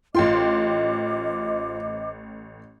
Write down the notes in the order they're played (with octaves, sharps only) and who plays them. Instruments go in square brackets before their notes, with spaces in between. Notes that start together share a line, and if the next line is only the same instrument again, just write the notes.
[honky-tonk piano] A1 G5 C6 [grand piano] F4 [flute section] C5 D#5 D6